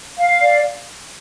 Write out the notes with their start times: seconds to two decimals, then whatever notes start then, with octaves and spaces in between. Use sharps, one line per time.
0.18 F5
0.41 D5